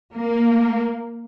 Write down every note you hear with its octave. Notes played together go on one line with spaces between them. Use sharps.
A#3